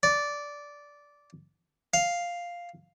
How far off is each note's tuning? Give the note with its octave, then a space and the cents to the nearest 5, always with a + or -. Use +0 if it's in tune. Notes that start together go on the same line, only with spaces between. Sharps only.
D5 -10
F5 +0